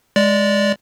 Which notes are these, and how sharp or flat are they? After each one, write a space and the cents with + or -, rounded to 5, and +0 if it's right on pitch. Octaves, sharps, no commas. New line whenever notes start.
G#3 +0 D5 -10